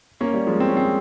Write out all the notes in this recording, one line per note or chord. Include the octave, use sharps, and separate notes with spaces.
A#3 C#4
G3 A#3
F3 G#3
C4
C#4
G#3 C4